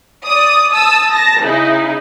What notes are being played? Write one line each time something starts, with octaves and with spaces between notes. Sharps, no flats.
D5 D#6
A5 D#6 E6
A5 A#6
C#3 D#4 E4